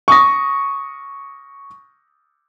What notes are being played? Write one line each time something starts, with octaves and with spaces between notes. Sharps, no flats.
C#6 D#6 A#6